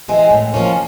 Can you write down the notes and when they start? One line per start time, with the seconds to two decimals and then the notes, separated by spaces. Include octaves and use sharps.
0.08 E3 G#3 C4
0.31 A2
0.53 F3 A#3 C#4 F4